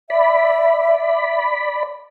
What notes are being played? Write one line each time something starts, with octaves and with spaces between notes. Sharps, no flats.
D5 E5 B5